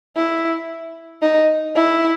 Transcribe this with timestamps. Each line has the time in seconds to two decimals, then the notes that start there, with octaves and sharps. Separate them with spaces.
0.16 E4
1.22 D#4
1.75 E4